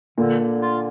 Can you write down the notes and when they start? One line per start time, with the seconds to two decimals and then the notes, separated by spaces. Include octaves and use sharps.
0.18 A#2 D3
0.39 D3
0.62 F4